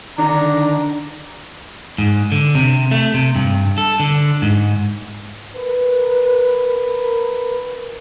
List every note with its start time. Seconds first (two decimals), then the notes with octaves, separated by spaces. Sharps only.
0.18 D3 D#3 D4 A#5
1.98 G#2
2.32 D3
2.55 C3
2.91 A3
3.14 C3
3.36 G2
3.78 A4
4.00 D3
4.42 G#2
5.56 A#4 B4